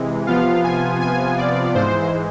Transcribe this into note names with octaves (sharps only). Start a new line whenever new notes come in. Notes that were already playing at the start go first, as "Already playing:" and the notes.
Already playing: C3 E3 G#3
C3 F3 B3 F4 F5
G#5
G#5
D5
G#2 E3 G#3 C5